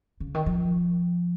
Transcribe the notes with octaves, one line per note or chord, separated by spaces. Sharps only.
C#3
D#3
F3